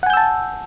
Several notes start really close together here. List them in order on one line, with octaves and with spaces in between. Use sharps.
F#5 G#5 G6 E6 A5